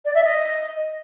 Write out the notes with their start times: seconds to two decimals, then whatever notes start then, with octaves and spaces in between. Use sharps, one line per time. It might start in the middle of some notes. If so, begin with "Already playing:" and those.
0.05 D5
0.15 E5
0.24 D#5